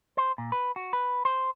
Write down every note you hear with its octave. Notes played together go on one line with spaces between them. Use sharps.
C5
A#2
B4
F#4
B4
C5